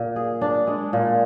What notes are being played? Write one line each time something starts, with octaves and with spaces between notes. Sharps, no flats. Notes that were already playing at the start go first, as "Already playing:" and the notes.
Already playing: A#2
G#4
D4
G#3
A#2